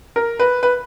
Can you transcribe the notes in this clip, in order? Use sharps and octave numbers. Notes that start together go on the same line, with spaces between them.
A#4
B4
B4